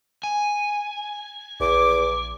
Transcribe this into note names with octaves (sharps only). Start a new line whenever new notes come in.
G#5
A#1 E2 D6